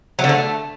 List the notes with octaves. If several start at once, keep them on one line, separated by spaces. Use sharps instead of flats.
F#3
D3
A3